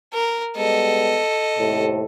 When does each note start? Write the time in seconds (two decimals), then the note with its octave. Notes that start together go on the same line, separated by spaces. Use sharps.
0.13 A#4
0.57 G3 G#3 B3 A4 D#5
1.58 D#2 A2 C3